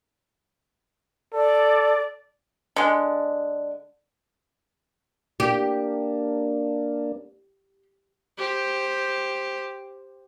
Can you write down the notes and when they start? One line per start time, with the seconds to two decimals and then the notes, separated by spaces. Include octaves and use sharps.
1.34 A4 D5
2.76 D3 G#3
5.40 A#3 D4 G4
8.38 G4 C5